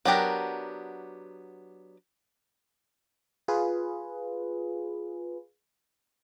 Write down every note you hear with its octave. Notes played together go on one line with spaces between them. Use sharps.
F#3 B3 D4 G4 A#4
F4 G#4 B4